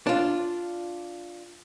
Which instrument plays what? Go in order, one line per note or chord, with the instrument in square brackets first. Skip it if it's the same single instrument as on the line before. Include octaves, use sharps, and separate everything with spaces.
[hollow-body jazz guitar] D4 F4